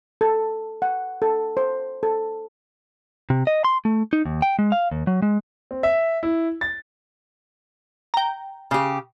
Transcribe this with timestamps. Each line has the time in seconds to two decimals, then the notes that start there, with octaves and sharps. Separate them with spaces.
0.21 A4
0.82 F#5
1.22 A4
1.57 C5
2.03 A4
3.30 C3
3.47 D#5
3.65 C6
3.85 A3
4.13 D#4
4.26 D#2
4.42 G5
4.59 G#3
4.72 F5
4.92 D#2
5.07 F#3
5.22 G#3
5.71 C4
5.83 E5
6.23 E4
6.61 A6
8.14 G5 A#5
8.71 C#3 G4